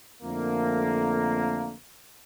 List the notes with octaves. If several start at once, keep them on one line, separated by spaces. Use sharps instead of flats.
F2 D3 A3 A#3